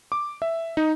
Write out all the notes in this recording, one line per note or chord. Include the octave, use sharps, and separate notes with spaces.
D6
E5
D#4